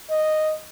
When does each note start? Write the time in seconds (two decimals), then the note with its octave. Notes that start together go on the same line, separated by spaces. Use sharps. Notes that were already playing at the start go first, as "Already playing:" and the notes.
0.10 D#5